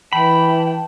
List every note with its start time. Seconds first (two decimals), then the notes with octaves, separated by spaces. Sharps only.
0.13 E3 G5 A5 B5